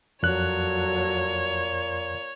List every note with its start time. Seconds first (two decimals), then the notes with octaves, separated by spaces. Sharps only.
0.23 F2 A#2 F#3 A4 C#5 F#6